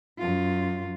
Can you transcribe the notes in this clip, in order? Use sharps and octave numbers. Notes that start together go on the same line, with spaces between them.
F#2 F4